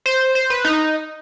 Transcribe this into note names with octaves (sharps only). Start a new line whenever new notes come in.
C5
C5
B4
D#4